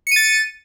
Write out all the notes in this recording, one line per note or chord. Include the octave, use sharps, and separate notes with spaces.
A6 C#7 D#7